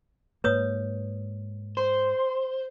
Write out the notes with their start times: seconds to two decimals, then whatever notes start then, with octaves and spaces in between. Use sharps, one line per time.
0.44 G#2 A#3 B4 C#5 D#6
1.77 C5